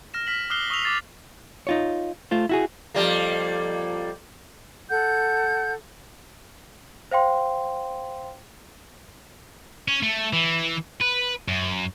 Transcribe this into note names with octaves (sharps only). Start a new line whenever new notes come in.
F6 A#6 E7
F6 B6 F#7
D6 D#6 F6 F#6 C7 G7
C#6 D#6 E6 F7
D6 A6 C7
D#4 F4 C#5
A3 F4 C5
E4 F#4 G#4
F2 G3 A#3
A4 F#5 G6
C5 F5 G5 C6
C#4
A3
E3
B4
F#2